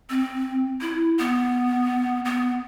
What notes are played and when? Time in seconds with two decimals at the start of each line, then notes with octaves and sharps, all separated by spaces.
0.10 C4
0.81 E4
1.19 B3
2.25 B3